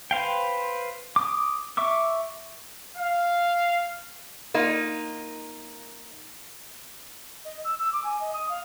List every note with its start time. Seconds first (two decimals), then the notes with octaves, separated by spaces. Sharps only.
0.11 B4 C5 F5 G5
1.16 D6 D#6
1.77 E5 C#6 D6 E6
2.97 F5
4.54 A#3 D#4 F4
7.45 D#5
7.64 E6
7.78 E6
7.92 D6
8.04 G#5
8.20 D#5
8.33 D#6
8.49 F5